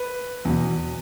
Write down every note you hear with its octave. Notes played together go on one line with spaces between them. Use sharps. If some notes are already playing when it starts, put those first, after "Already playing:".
Already playing: B4
E2 B2